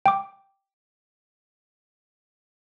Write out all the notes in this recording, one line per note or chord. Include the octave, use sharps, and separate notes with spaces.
G5 D6